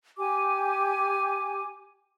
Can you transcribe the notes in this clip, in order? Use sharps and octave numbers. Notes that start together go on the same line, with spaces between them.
G4 G#5 D6